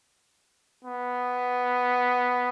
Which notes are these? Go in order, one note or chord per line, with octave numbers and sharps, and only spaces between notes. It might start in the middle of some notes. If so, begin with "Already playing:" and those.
B3